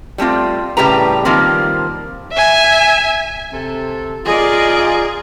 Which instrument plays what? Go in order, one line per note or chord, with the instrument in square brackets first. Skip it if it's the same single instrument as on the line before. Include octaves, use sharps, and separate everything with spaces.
[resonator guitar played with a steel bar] G3 A3 C4 F4
A2 C#3 G3 G4 B4 A#5
D#3 F3 G3 A#3 C4
[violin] E5 G#5
[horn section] C3 A4
[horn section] F4 A#4 [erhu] G#4 [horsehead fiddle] D5 D#5